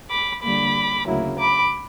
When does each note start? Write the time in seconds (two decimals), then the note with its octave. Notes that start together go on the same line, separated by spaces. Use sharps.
0.10 B5 D6
0.42 D3 G3 A#3 B5 D6
1.06 D2 C#3 F#3 A#3 E4
1.38 B5 D6